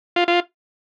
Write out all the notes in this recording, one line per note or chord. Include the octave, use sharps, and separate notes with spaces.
F4
F4